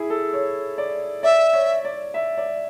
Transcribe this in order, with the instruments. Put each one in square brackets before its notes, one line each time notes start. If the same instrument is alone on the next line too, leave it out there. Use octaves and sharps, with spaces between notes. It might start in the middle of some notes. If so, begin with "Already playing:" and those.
Already playing: [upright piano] E4 G#4
A4
C#5
D5
[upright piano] D5 [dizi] E5
[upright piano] C#5
D5
E5
D5